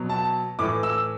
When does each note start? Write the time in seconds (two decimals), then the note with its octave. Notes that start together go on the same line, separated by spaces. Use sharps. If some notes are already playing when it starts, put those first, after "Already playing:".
Already playing: B2 F#3
0.09 A5
0.59 A2 E3 D6
0.83 E6